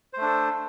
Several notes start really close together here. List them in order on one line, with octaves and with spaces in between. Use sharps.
C5 A3 D4 A4